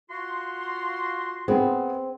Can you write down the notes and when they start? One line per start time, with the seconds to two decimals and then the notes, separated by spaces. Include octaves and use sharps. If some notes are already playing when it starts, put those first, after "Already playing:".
0.10 F4 F#4 C6
1.48 B3 C4 G#4